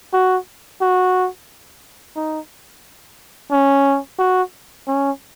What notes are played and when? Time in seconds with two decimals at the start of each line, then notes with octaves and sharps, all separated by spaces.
0.13 F#4
0.81 F#4
2.16 D#4
3.51 C#4
4.18 F#4
4.87 C#4